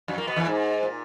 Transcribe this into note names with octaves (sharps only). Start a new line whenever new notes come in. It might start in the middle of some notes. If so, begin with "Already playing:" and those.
F#2 F#3
A#2 A#3
B2 B3
E2 E3
G#2
A#2